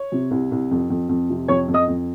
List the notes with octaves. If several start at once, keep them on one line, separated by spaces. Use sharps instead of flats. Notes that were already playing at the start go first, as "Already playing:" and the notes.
Already playing: C#5
C3
C2
C2
F2
F2
F2
C3
F2 C#5 C#6
F2
D#5 D#6
F2